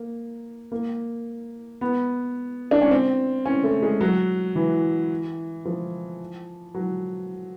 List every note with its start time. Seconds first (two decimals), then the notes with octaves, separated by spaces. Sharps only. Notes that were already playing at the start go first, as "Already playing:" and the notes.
Already playing: A#3
0.72 A#3
1.81 B3
2.71 D4
2.81 C#4
2.91 C4
3.46 C#4
3.64 A3
3.82 G#3
4.01 F#3
4.56 E3
5.65 F3
6.74 F#3